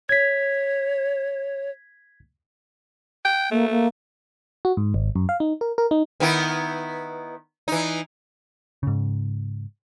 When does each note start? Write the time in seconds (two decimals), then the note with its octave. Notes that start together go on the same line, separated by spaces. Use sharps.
0.09 C#5 G#6 B6
3.25 G5
3.51 A3 A#3
3.70 A#3
4.65 F#4
4.77 G#2
4.94 G#1
5.16 F#2
5.29 F5
5.40 D#4
5.61 A#4
5.78 A#4
5.91 D#4
6.20 D#3 B3 E4
7.68 E3 D#4
8.83 G#2 C#3